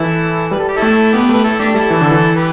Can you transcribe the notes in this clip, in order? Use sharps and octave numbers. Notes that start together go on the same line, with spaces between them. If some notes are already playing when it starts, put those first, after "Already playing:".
Already playing: E3 E4 A4
G3 B4
A4
G4
E4 A4
A3
B3 G4 B4
A3 B4
E4 A4
A3 D4 G4
G3 E4 A4
E3
D3
E3
G4 B4